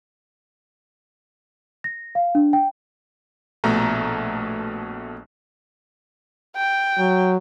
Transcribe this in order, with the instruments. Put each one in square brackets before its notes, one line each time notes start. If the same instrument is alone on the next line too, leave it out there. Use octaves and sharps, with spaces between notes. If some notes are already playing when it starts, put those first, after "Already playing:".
[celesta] A#6
F5
D4
G5
[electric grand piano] A#1 B2 A3 A#5
[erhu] G5
[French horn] F#3